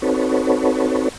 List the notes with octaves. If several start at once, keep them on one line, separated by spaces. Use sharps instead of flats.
C4 D#4 F#4 A4 B4 C#5